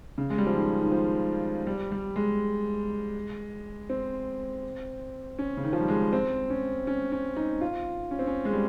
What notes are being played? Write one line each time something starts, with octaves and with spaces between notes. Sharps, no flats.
C#3
G#3
G3
F3
D#3
D#3
F3
G3
G3
G#3
C4
C#4
C#3
D#3
F3
G3
G#3
C4
C#4
C#4
C#4
D#4
F4
C#4
C4
C#4
G#3
G3